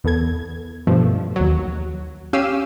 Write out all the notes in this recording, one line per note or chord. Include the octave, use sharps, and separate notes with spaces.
E2 B3 A4 G#6
G2 B2 F3 A3
D#2 F#3
C#4 G4 F5 E6 C7 D#7